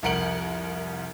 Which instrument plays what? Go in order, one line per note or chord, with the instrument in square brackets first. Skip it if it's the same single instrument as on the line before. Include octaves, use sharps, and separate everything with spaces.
[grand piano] C2 F2 A#4 F#5 D7 F#7